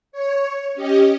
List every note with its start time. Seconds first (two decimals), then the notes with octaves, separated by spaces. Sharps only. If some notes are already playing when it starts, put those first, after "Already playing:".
0.12 C#5
0.74 C#4 G4 D#5